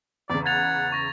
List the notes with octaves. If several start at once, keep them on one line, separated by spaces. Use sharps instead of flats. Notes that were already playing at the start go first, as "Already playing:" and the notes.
E2 C#3 D5
F#5 G#6 A6 F7
C#6 A#6